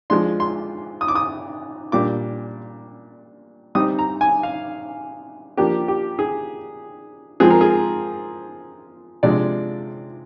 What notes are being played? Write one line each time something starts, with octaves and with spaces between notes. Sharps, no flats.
F3 G#3 D4 C6
C6
D#6
D6
D#6
A#2 G3 D4 D6
G3 C4 D#4 D#6
A#5
G#5
F5
F3 A#3 D4 G4
G4
G#4
F3 G#3 C4 F4 G#4
A#4
G#4
C3 F3 G#3 D4 D5